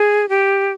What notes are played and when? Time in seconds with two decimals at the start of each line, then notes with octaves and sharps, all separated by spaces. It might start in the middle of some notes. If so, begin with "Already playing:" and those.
Already playing: G#4
0.29 G4